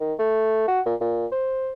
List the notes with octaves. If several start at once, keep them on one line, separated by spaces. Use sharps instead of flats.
D#3
A3
F#4
A#2
A#2
C5